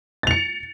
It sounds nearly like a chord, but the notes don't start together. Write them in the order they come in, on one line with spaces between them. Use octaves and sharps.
A6 F7 C#7